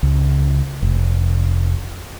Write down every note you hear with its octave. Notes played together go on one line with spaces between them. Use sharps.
C#2
F1